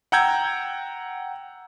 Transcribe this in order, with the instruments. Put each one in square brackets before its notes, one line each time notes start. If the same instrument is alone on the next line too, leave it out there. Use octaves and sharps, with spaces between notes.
[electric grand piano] F#5 G5 A#5 E6 G6 G#6